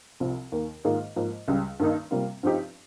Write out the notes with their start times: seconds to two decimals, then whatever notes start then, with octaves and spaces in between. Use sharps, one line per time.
0.20 C2 C3 F3
0.52 D#2 D#3 A#3
0.84 G#2 D#3 A#3 F4 G#4
1.16 G#2 F3 A#3
1.48 C#2 C#3 G3
1.80 G2 D#3 A#3 D#4
2.11 C3 G3 A#3 F4
2.43 G2 F3 C4 D#4 G4